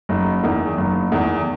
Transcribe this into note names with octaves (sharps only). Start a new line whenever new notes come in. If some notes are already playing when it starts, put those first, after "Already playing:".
F#1 D#4
E2 D#3
F#1
E2 D#3